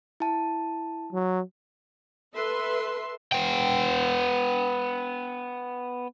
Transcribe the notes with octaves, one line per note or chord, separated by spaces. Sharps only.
E4 A5
F#3
A4 B4 E5 C6
B3 G5